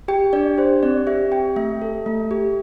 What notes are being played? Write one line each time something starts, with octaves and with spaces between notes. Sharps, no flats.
G4 G5
D4 D5
G4 C5
C4 D5
G4 E5
G4 G5
A3 E5
A4
A3
G4